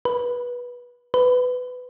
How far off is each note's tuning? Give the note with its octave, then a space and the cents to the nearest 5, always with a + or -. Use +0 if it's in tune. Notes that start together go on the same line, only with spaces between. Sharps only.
B4 -20
B4 +15